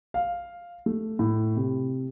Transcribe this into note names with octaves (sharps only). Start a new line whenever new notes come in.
F5
A3
A2
C3